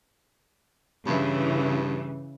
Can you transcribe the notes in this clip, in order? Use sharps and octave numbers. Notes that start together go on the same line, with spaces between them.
G2 C#3 E3